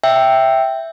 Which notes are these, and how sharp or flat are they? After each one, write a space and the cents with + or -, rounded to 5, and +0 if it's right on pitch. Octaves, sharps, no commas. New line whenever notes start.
E5 +0 G5 +0